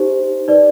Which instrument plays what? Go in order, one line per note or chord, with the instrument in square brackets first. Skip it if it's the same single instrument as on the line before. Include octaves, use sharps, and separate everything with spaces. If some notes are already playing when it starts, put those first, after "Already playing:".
Already playing: [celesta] D#4 G4 C5
D#4 B4 D5